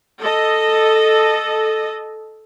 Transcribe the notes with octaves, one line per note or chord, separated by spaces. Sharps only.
A4 D#5